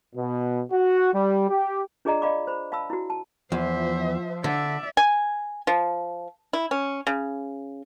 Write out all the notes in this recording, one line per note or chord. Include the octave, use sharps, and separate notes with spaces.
B2
F#4
G3
G4
D4 F4 G#4 D5 D#5 A#5
D5 D#5 F5 B5 D6
C5 B5
F5 A5 B5 E6
E4 F#4
A5
E2 F3 C5 E5
D3 D5 E5
G#5
F3
E4
C#4
C#3